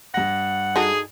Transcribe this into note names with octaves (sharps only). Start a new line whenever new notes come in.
G2 F#5 A#6
D#4 F#4 G#4 A4